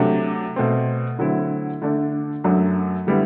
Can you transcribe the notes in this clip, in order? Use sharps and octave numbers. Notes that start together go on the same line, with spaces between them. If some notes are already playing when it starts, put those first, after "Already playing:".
Already playing: C3 F#3 A3 D4
B2 A3 C4
D3 F#3 A3 C4 E4
D3 A3 D4
F#2 F#3 A3 D4
D3 G3 B3 E4